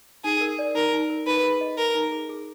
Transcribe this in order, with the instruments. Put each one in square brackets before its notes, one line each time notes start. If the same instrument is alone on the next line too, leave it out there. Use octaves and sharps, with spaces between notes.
[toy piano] D#4 [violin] G#4
[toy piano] A#4
D5
[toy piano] D#4 [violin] A#4
[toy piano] D#4
A#4
[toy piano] D#4 [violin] B4
[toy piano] G#4
D#5
[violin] A#4 [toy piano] A#5
[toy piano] D#4
G#4
G#4